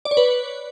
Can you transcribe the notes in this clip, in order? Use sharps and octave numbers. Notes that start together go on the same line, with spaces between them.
D5
C#5
B4